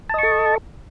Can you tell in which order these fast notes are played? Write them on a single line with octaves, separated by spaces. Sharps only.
A5 D#5 C#6 A4